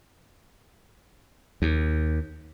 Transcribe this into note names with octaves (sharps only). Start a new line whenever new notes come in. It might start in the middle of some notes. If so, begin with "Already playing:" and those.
D#2